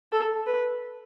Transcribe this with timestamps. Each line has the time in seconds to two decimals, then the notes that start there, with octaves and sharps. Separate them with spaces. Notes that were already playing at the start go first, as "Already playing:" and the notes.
0.12 A4
0.46 B4